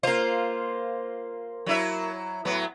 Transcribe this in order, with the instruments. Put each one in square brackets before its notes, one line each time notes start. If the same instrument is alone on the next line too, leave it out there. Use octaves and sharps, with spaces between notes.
[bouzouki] A#3 F4 [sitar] C5
[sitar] F#3 E4 E5
A2 F#3 B3